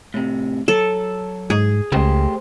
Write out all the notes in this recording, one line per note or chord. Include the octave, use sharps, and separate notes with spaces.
A2 C3
F#3 A4
G#2 G#4
C#2 A3 G4 C5